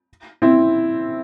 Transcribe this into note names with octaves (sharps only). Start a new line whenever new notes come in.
C4 E4